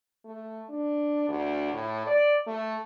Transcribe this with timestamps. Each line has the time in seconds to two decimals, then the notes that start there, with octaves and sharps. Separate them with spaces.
0.25 A3
0.70 D4
1.28 D2
1.73 A2
2.07 D5
2.47 A3